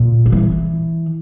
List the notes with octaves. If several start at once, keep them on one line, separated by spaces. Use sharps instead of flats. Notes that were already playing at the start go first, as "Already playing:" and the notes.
Already playing: A#2
F3
E3